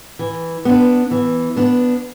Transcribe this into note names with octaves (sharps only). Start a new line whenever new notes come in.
E3
B3 D4
E3
B3 D4